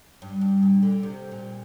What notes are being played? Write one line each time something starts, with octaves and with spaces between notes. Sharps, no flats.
G2
G2
A#2
D3
C3
A#2